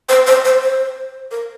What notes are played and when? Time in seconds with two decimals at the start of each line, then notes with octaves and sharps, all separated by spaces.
0.09 C5
0.27 C5
0.45 C5
0.62 C5
1.31 A#4